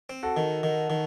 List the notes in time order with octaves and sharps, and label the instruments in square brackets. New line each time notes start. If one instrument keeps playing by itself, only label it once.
[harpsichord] C4
[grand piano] F#4 A4
[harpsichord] D#3
D#3
D#3